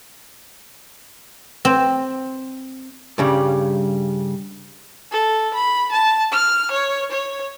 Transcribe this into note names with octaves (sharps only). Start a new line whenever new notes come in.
C4
G2 C#3 G3
A4
B5
A5
F6
C#5
C#5